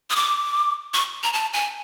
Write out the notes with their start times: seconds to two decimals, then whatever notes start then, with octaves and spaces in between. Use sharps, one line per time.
0.10 D#6
0.16 D6
0.94 C#6
1.23 A#5
1.33 A5
1.53 G#5